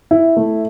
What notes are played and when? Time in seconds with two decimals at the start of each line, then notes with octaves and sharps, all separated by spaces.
0.11 E4
0.37 A3